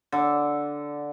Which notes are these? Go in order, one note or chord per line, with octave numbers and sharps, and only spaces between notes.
D3